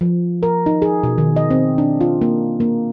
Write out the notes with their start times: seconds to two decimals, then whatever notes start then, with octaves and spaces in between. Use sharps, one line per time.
0.01 F3
0.43 A#4
0.66 D#4
0.82 G#4
1.03 B2
1.18 D#3
1.36 D#5
1.50 C4
1.78 D4
2.01 F4
2.21 A#3
2.60 A#3